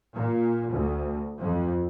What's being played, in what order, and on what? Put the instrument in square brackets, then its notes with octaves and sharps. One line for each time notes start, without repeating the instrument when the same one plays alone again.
[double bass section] A#2
D2
F2